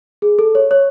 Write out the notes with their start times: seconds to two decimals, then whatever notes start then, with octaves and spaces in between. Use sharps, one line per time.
0.22 G#4
0.39 A4
0.55 C#5
0.71 C#5